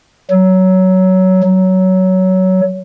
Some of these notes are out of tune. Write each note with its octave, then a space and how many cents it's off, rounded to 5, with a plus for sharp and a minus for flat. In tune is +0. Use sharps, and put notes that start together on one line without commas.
F#3 +15
F#3 +15